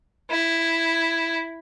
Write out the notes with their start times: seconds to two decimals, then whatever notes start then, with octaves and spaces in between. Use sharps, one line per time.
0.30 E4